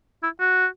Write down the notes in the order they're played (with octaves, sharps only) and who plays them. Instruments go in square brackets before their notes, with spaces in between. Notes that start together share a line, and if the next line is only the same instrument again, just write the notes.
[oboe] E4
F#4